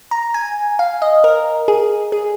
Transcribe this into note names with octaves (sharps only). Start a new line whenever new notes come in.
A#5
G#5
F5
D#5
A#4
G#4
G#4